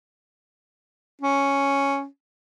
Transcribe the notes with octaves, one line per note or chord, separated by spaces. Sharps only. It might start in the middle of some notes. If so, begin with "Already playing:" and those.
C#4